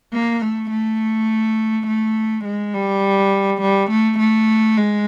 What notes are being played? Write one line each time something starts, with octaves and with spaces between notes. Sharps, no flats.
A#3
A3
A3
A3
G#3
G3
G3
A3
A3
G#3